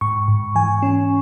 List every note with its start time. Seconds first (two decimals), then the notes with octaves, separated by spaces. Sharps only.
0.01 G#2 C#6
0.28 G#2
0.55 E3 G#5
0.82 C#4